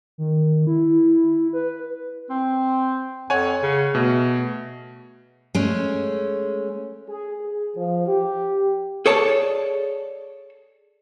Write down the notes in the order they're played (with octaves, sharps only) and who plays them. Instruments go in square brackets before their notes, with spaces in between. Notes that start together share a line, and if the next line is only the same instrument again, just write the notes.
[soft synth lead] D#3
E4
B4
[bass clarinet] C4
[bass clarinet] F2 [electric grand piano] C#5 F#5 G#5
[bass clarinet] C#3
[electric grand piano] B2 [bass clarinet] A3
[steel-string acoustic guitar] G#3 A3 C#4
[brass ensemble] G#4
G#4
F3
G4
[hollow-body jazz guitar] G#4 A4 C#5 D5 A5